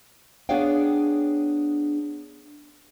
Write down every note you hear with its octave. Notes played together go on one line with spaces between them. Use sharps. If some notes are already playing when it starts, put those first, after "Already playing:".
B3 D4 G#4 C#5 F5 G5